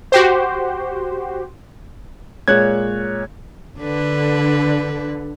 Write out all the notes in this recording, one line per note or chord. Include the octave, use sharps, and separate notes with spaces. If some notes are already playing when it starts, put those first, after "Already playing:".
F#4 G4 C5
A#2 G#3 C#5 F#6 G#6
D3 D4 B4